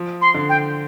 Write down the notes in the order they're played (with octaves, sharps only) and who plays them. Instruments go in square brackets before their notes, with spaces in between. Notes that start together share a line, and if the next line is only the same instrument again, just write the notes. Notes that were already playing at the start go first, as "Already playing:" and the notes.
Already playing: [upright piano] F3
[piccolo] C6
[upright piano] D3
[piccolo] G5